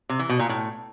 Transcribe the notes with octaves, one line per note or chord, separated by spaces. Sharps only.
C3
E3
B2
A#2
A2